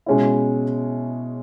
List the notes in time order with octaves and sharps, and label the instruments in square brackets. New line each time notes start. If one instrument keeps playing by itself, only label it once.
[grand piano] B2 G#3 C#4 E4